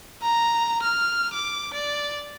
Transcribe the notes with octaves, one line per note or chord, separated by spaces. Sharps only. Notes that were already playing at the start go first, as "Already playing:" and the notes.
A#5
F6
D6
D5